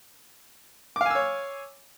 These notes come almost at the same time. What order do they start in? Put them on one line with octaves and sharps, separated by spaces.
D6 F5 G#5 E6 C#5